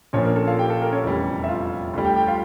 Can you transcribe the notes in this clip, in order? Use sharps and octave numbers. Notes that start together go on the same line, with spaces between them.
A#1 A#2 F3 C#4 C#5
A#3 A#4
A4
F4 F5
G4 G5
A4
A#3 A#4
C#4 C#5
F1 E2 E3 G3
E5
F4 F5
D2 D3 G3
G4 G5
G4 G5
F4 F5